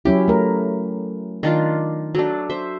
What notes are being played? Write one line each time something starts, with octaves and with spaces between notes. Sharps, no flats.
F#3 C#4 E4 G4
A3 A#4
D#3 D4 F4
F#3 A3 D4
C5 E5